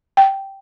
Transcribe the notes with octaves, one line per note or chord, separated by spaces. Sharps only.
G5